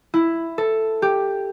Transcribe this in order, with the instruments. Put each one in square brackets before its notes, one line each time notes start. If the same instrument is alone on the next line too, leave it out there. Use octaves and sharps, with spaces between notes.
[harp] E4
A4
G4